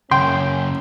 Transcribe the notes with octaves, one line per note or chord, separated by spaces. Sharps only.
F#2 C#3 C#4 G5 C6